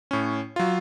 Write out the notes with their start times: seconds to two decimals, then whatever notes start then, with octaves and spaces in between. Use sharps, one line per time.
0.11 A2 C#4
0.56 F#3 F4